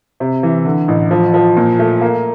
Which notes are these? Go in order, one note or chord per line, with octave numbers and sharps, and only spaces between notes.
C3
E3
D3
A1
F3
F3
A#2
A3
A#3